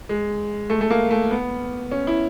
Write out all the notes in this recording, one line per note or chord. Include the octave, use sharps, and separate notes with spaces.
G#3
A3
A3
A#3
A3
B3
C#4
E4